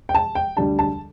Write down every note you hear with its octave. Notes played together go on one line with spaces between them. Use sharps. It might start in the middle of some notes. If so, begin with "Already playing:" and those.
G5
A5
G5
D2 D3 G3 D4 A5
A5